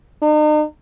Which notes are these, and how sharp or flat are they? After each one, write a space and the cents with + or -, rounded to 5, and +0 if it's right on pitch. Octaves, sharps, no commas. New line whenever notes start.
D#4 -40